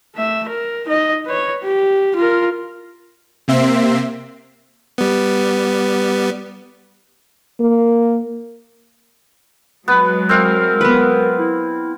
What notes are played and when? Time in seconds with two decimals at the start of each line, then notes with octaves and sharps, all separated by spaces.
0.15 A3 E5
0.49 A#4
0.86 D#4 D#5
1.26 B4 C#5
1.64 G4
2.16 F4 A#4
3.48 C3 A#3 C4 E5 C6
4.98 G3 B3
7.60 A#3
9.88 F#3 G#3 B3 B4
10.29 C4 A#4 F5
10.81 B3 B4
11.38 E4